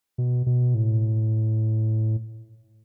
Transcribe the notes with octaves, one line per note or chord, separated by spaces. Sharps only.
B2
B2
A2